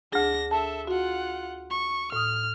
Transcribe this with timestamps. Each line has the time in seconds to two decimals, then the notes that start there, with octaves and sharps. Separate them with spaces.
0.12 D2 D4 G#4 A#6
0.51 A4 E5 A5
0.87 F4 F#4 F#5
1.71 C#6
2.12 A2 D#6 F6